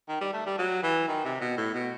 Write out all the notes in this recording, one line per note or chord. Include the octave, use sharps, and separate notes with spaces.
D#3
G3
A3
G3
F#3
E3
D#3
C3
B2
A2
B2